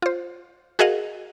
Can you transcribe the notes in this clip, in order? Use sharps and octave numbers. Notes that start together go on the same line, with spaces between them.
F4 C5
F#4 G#4 A#4 D#5 F5 F#5